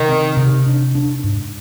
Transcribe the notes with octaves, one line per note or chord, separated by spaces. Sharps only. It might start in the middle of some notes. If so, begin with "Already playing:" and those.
Already playing: C3 D#3
C4
C3
D4
D4
G#2